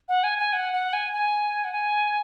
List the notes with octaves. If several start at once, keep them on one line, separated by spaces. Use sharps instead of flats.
F#5
G#5
G#5
F#5
F#5
G#5
G#5
F#5
G#5